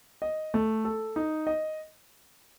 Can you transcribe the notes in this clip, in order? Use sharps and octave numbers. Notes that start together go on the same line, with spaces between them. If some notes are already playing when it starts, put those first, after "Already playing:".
D#5
A3
A4
D#4
D#5